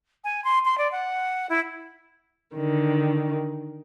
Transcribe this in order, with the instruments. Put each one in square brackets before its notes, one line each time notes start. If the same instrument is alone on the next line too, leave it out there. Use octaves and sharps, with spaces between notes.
[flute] G#5
C6
C6
D5
F#5
E4
[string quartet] D3 D#3